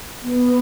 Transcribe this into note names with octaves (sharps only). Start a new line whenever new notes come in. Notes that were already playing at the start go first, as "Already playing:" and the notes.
B3